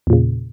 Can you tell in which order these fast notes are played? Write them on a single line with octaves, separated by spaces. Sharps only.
E2 A#2 C#3